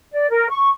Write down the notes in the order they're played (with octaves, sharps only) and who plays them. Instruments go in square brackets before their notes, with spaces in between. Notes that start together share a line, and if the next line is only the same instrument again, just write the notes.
[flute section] D5
A#4
C#6